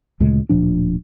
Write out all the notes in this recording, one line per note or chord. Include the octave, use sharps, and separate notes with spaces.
D2 A#2 C#3 G#3
D1 A#2 F3 D4